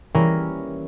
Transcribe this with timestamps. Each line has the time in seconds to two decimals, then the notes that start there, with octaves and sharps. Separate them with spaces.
0.15 E3 G3 A#3 C#4 E4 A#4